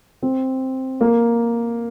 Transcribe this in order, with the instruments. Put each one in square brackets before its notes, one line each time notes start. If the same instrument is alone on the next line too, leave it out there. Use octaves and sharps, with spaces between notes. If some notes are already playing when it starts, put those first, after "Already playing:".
[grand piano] C4
A#3